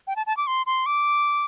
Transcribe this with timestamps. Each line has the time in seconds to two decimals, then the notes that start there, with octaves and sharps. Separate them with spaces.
0.07 G5
0.16 A5
0.27 A5
0.37 D6
0.47 C6
0.66 C6
0.86 D6